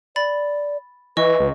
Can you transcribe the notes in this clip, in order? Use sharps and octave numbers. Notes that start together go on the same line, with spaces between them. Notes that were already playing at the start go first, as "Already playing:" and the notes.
D5 B5 A6
E3 B4 D#5 C#6
C#2